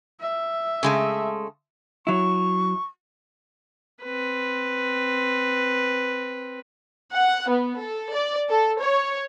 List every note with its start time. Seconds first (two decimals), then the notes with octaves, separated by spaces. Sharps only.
0.21 E5
0.83 C#3 G#3 A3
2.07 F#3 E4 C#6
4.03 C4 B4
7.15 F#5
7.49 B3
7.82 A4
8.14 D5
8.50 A4
8.81 C#5